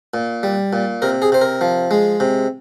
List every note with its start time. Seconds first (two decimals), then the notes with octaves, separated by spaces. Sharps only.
0.14 A#2
0.43 G3
0.73 A#2
1.02 C3 A#4
1.22 G#4
1.32 C3 C5
1.41 A#4
1.61 F3
1.91 G#3
2.20 C3